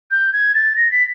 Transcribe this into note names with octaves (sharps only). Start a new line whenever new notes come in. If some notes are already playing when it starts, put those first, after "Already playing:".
G6
G#6
A6
A#6
B6